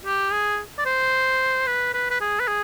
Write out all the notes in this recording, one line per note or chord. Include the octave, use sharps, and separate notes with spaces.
G4
G#4
D5
C5
B4
B4
B4
G#4
B4
G#4